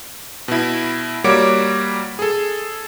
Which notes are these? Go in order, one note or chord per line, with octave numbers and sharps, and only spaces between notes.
B2 E4
G3 A#3 F#4 C#5 D6 D7
G#4 A4